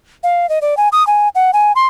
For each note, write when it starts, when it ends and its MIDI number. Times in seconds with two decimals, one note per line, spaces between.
0.23 0.49 77
0.49 0.59 75
0.62 0.77 74
0.77 0.88 80
0.92 1.05 87
1.07 1.29 80
1.35 1.51 78
1.53 1.72 80
1.76 1.87 84